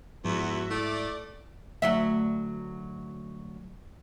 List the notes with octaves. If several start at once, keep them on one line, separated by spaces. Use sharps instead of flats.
E2 G#2 F3 F#4 E5
A3 E4 D5 D6
D2 F#3 E5